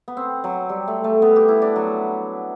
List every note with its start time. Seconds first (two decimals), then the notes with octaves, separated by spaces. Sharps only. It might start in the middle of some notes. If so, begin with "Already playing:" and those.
0.08 B3
0.17 C4
0.44 F#3
0.69 G3
0.88 A3
1.04 A3
1.22 B3
1.36 G4
1.48 E4
1.62 D4
1.76 F#3